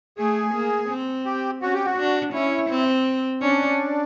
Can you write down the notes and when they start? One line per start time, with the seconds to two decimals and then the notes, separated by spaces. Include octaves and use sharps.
0.18 A3 G#4
0.54 A#3
0.89 C4
1.26 G4
1.62 C#4 F#4
1.74 G4
1.85 F#4
1.97 D4
2.33 C#4 E4
2.69 C4
3.42 C#4 D4